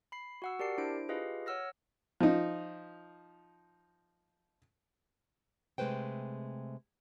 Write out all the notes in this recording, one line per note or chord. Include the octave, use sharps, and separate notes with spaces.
B5 C7
F#4 F#5 E6
G4 A#4 D5 A5 C7
D4 E4 C5 D7
F4 G4 G#4 B4 D#5 F5
C#5 F#5 E6 F6 A#6
F3 D#4
C3 G#3 A3 B4 C5 G5